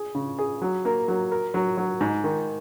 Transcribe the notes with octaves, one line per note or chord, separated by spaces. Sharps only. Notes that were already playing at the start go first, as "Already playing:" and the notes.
Already playing: G#4
C#3
G#4
F#3
A#3
F#3
A#4
F#3
F#3
G#2
D#3